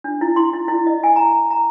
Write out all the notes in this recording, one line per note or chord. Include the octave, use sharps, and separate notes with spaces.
D4
E4
C6
E4
E4
D#5
G#5
A#5
A#5